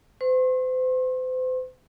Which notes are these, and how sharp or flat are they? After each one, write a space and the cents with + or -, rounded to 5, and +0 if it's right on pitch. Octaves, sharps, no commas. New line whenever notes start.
C5 -40 C6 +40